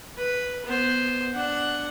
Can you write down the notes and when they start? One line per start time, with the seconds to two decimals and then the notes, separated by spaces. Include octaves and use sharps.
0.17 B4
0.65 B3 C5
1.34 D4 F#5